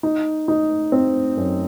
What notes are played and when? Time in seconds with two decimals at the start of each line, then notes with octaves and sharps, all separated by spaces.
0.03 D#4
0.48 D#4
0.92 C4
1.37 F#2